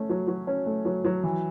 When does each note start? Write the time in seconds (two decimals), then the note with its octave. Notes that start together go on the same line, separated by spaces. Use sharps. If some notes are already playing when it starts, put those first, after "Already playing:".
Already playing: A3 C#4
0.10 F#3
0.28 F#3
0.47 C#4
0.66 A3
0.85 F#3
1.05 F#3
1.24 E3